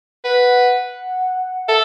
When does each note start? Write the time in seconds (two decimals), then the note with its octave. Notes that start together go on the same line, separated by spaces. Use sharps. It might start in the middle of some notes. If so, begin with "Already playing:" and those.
0.24 B4 F#5
1.68 A4 E5